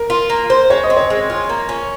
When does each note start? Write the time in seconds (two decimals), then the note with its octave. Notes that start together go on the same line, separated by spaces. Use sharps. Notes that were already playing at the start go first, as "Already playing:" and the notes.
Already playing: A#4
0.10 F4
0.30 A#3
0.50 C5
0.70 G#3 C#5
0.83 D#5
0.90 C4
0.97 C#5
1.10 G#3
1.30 F4
1.49 A#3
1.69 C#4